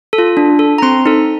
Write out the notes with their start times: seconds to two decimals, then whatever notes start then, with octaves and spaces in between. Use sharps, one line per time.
0.13 A4
0.18 F4
0.37 D4
0.59 A4
0.78 A#5
0.82 C4 C6
1.06 D#4 A4